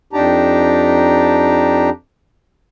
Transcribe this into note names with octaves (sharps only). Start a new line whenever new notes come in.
F2 D4 D#4 G4 A5 A#5